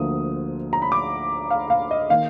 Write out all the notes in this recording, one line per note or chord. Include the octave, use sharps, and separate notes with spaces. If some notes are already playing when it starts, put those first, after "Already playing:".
Already playing: D2 D3 F3 A#3 D#6
A#5
B5
D6
F5
F5
D#5
D#3 A#3 D#4 F5